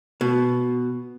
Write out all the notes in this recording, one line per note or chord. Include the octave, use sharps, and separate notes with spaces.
B2